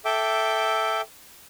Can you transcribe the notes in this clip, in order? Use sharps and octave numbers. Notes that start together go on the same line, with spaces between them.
A4 E5 G5 D6